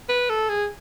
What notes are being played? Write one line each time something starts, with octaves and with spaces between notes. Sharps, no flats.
B4
A4
G#4